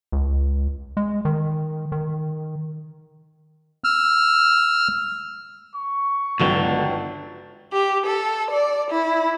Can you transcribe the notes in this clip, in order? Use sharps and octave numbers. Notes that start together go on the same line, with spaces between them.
C#2
G#3
D#3
D#3
E6 F6
C#6
G1 C#2 D3 D#3 F#3
G4
A4
D5
E4